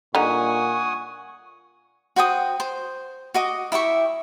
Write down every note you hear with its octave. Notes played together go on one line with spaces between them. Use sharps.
A#2 D3 G3 D#4 F#5 G#5 C#6 D#6
F#4 C5 G5 D#6
C5
F#4 D#5 D6
E4 G4 E5 C#6